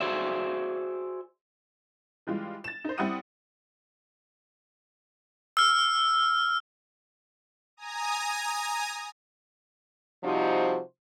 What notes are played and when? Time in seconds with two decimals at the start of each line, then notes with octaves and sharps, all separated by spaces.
0.01 F#4 G#4 C5 D5 E5
2.27 E3 G3 G#3 F4
2.64 A6 E7
2.84 D#4 C5
2.98 G3 C4 E4 F#5 D#6 D#7
5.57 E6 F6
7.77 G#5 A#5 D#6
10.24 C3 F3 G3 D#4 F#4 C5